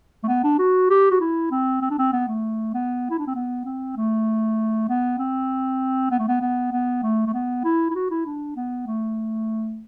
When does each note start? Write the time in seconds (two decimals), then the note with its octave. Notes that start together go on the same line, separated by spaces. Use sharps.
0.24 A3
0.28 B3
0.44 D4
0.59 F#4
0.90 G4
1.11 F#4
1.20 E4
1.51 C4
1.82 C4
1.90 D4
1.99 C4
2.13 B3
2.28 A3
2.74 B3
3.10 E4
3.19 D4
3.27 C4
3.35 B3
3.65 C4
3.96 A3
4.89 B3
5.18 C4
6.11 B3
6.19 A3
6.28 B3
6.41 B3
6.72 B3
7.03 A3
7.26 A3
7.34 B3
7.64 E4
7.90 E4
7.95 F#4
8.11 E4
8.26 D4
8.56 B3
8.87 A3